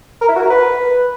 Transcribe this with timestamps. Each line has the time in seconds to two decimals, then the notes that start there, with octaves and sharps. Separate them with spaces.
0.21 A#4
0.28 E4
0.36 F#4
0.43 A#4
0.50 B4